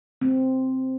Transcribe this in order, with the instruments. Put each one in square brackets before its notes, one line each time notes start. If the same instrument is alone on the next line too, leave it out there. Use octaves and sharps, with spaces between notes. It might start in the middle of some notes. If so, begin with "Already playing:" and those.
[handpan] C4